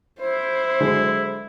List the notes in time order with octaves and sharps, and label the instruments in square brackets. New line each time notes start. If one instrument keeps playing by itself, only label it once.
[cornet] E4 [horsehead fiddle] C5
[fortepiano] D3 F#3 G#3